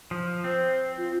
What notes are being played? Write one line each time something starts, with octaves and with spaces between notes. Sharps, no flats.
F3
C4 C5
F4